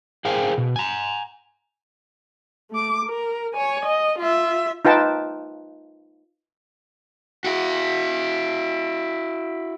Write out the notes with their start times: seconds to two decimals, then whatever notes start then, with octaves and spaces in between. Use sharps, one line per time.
0.25 G#4 A#4 C5 F5 G5 G#5
0.58 B2
0.76 G#5 A#5
2.71 A3 D6
3.05 A#4
3.54 C#5 G#5
3.85 D#5
4.18 F4 E5
4.85 D#4 F4 B4 G5 A5
7.44 E4 F#4